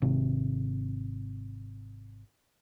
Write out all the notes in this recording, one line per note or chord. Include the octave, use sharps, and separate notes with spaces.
G#1 C3